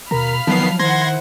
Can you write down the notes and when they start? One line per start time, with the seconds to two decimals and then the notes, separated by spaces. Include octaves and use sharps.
0.11 D#2 B2 A#4 F5 A#5 B5 F6
0.47 D#3 F3 F#3 B3 A5 C7
0.79 D#3 E4 C5 F#5 C6 G#6 A#6